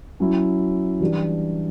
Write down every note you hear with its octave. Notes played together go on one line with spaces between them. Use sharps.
F#3 C#4 E4
E3 G3 D4 G4